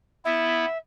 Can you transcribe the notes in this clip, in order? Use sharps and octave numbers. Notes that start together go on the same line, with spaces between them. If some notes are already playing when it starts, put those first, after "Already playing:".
B3 E4 E5